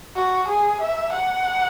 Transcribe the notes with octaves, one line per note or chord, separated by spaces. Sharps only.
F#4
G#4
E5
F#5